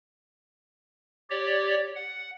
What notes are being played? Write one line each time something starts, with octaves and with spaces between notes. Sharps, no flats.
G4 C#5 D5
F#5